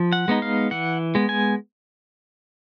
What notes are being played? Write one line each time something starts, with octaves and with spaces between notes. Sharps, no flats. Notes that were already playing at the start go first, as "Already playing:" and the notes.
Already playing: F3
F#5
G#3 B3 D#4
F5
E3 F#5
G#3 B3
G#5